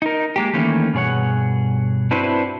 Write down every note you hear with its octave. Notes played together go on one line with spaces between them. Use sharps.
D#4 A#4
G#3 A#3 G4
D#3 E3 A3 A#3 C#4
G2 B2 G#4 C#5 F#5
C4 D4 E4 F#4 B4 C5